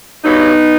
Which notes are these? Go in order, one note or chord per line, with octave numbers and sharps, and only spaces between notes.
G2 F#3 B3 D#4